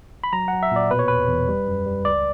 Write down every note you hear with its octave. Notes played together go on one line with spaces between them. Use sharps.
B5
F#3 A#5
F#3 F#5
E5
A#2 D5
B2 B4
C#5
E2 B4
E2
G3
F#2
G3
C#2 D5